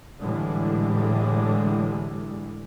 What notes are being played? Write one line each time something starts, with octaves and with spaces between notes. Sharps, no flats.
A2 D3 E3 G3 G#3